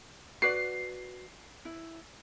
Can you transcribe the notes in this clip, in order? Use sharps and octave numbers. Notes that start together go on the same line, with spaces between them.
F#4 B4 D5 C7
E4